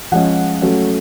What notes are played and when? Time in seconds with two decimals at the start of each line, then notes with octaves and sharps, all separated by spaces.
0.12 F3 G#3 C#4 F#5
0.62 F#3 A3 C#4